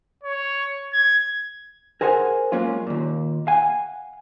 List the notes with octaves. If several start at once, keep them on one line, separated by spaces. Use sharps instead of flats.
C#5
G#6
G#4 A#4 C5 F#5 G#5
F#3 G#3 A#3 C#4 F4
D#2 A#2
F5 F#5 G#5